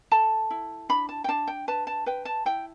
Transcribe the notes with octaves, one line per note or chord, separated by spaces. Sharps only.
A4 A5
E4
D4 B5
A5
G5
D4 A5
G5
B4 A5
A5
B4 G5
A5
E4 G5